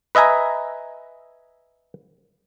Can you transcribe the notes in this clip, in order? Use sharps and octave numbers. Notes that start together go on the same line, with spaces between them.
B4 D#5 E5 G#5 A#5